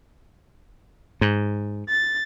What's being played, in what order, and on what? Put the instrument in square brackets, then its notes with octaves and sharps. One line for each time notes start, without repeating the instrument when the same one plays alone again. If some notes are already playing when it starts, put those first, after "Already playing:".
[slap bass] G#2
[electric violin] A6